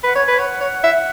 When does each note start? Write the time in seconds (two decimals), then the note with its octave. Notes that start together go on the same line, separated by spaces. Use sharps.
0.04 B4 F#5
0.15 C#5 G#5
0.28 B4 G#5
0.38 C#5 F#5
0.60 C#5 F#5
0.84 E5